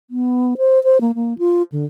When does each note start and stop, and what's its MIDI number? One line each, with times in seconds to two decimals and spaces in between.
0.10 0.54 59
0.58 0.82 72
0.84 1.00 72
1.01 1.12 58
1.15 1.37 58
1.39 1.62 65
1.72 1.85 50